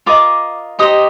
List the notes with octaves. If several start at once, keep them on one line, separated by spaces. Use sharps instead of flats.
F4 A#4 D#5 D6
D#4 G4 C5 D#5 D#6